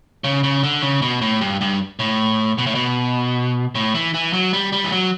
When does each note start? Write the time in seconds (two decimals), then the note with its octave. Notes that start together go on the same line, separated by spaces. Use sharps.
0.24 C#3
0.44 C#3
0.63 D3
0.82 C#3
1.02 B2
1.21 A2
1.41 G2
1.61 G2
1.99 A2
2.58 B2
2.66 A2
2.75 B2
3.75 A2
3.95 E3
4.14 E3
4.33 F#3
4.53 G3
4.72 G3
4.84 E3
4.92 F#3